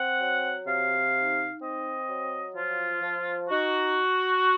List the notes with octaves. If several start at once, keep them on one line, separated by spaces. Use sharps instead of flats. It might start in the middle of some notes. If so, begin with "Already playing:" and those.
Already playing: C4 F#5
F#3
C3 F5
D#4
C4 D#5
F#3
F3 F4
F3
D#4 F#4